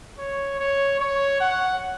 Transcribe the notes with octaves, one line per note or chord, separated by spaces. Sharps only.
C#5
C#5
C#5
F#5